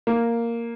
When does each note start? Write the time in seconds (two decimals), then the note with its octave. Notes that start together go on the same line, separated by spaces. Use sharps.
0.07 A#3